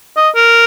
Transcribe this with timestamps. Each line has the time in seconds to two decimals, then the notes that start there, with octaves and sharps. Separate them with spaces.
0.17 D#5
0.35 A#4